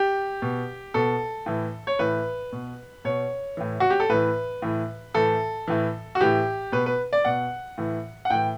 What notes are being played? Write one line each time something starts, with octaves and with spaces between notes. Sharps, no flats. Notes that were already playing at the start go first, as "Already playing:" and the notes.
Already playing: G4
B2
B2 A4
A2 E3
C#5
A2 E3 B4
B2
B2 C#5
A2 E3
F#4
G4
A4
A2 E3 B4
A2 E3
A2 E3 A4
A2 E3
F#4
A2 E3 G4
B2 B4
B4
D5
B2 F#5
A2 E3
F#5
A2 E3 G5